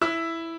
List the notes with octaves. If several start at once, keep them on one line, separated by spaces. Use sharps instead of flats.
E4 E6